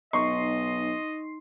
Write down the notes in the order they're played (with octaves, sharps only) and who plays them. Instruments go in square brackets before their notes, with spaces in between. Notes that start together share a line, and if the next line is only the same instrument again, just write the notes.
[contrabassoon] B1 [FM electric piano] D#4 C6 C7 [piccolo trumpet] D#5 [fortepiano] C#6